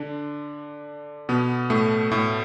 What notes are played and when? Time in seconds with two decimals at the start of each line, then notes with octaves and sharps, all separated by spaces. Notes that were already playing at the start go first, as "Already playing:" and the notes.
Already playing: D3 D4
1.29 B2 B3
1.70 A2 A3
2.11 A2 A3